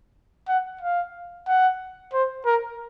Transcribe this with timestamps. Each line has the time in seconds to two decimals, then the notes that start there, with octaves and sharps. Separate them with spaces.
0.49 F#5
0.81 F5
1.48 F#5
2.13 C5
2.45 A#4